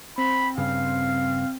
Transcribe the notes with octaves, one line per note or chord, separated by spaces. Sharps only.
C4 B5
G2 C#3 F5